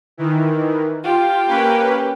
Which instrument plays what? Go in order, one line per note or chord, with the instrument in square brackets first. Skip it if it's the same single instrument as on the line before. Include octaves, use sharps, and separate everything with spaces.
[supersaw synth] D#3 E3
[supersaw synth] F4 [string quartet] G4
[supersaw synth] A#3 C#4 B4